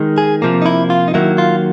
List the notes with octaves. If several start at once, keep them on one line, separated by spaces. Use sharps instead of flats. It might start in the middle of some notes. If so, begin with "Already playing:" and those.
Already playing: D#3 G#3
G#4
C3 F3 A#3
D#4
E4
F4
D#4
D#3 F#3 A#3 E4
F4